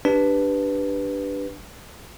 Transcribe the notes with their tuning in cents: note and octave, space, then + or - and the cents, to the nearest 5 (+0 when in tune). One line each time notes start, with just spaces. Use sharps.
D4 +0 G4 +0 B4 +0